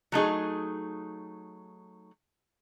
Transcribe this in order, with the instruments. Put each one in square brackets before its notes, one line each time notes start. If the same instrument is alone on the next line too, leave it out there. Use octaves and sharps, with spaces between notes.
[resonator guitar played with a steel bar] F#3 A3 D#4 G#4